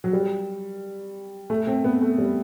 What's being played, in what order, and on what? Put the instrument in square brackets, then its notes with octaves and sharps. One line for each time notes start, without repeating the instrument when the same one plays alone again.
[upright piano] F#3
G3
A3
C4
B3
A3
G3